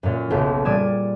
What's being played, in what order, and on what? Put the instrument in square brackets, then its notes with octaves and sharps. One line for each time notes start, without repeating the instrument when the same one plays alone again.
[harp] F#2 A#2
F#1 B1
A#2 G3 D5 D#6 G#6 E7